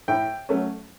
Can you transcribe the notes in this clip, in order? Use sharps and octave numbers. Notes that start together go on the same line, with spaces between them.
A2 G5
F#3 A3 C#4